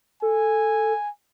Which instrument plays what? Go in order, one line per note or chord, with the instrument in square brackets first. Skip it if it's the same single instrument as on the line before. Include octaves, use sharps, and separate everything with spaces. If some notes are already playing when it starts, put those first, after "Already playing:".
[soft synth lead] A4 [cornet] G#5